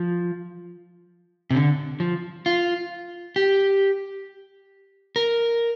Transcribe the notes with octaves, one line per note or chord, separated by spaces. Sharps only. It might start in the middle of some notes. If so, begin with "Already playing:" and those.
Already playing: F3
C3
D3
F3
F4
G4
A#4